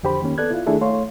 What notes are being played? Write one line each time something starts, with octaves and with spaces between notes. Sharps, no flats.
F2 D3 G4 C5 B5
D#3 A#3 C#4
B3 A4 D5 F#6 G#6
E4 F4
D#3 A3 D4 E4 G#4 A4
A3 C#5 F5 C6